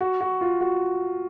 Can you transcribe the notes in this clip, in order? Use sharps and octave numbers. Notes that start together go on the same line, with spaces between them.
F#4
F#4
F4
F#4